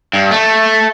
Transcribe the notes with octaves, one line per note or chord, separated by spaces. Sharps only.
G2
A3